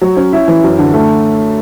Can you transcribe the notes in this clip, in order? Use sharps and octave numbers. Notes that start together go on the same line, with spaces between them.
F#3
C#4
E4
E3
F#2
D3
A3